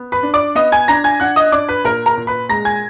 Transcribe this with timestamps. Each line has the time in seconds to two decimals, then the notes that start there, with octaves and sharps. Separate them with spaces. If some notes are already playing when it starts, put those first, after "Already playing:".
Already playing: B3
0.12 B4 B5
0.23 D4
0.34 D5 D6
0.55 B3 D#5 D#6
0.72 G#5 G#6
0.88 D4 A#5 A#6
1.04 G#5 G#6
1.20 D4 F#5 F#6
1.36 D#5 D#6
1.52 D4 D5 D6
1.69 B4 B5
1.84 A#2 A#4 A#5
2.06 A#4 A#5
2.17 A#2
2.27 B4 B5
2.49 G#3 A#5 A#6
2.65 G#5 G#6